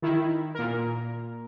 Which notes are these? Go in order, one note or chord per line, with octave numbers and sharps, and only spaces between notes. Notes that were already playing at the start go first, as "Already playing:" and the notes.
D#3 E4
A#2 A#4